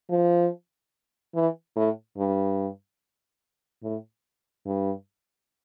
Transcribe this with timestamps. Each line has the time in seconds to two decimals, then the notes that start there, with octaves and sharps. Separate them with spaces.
0.10 F3
1.35 E3
1.76 A2
2.17 G2
3.83 A2
4.66 G2